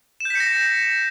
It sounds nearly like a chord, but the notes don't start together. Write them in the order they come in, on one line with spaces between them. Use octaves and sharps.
E7 G6 B6 C#7 A#6